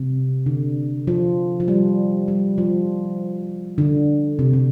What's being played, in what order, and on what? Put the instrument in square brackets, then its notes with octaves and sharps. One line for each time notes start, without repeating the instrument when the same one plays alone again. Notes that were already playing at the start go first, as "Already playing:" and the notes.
Already playing: [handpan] C3
D3
F3
F3
G3
G3
F3
D3
C3
C3